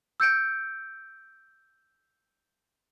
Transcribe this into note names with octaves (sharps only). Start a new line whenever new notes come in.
E6 G6 C#7 D7